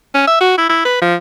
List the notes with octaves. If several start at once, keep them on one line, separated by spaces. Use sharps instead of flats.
C#4
E5
F#4
E4
E4
B4
F3